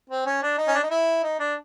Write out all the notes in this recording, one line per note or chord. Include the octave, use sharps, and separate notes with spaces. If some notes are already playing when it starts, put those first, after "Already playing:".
C4
C#4
D4
D#4
C#4
D4
D#4
E4
D#4
D4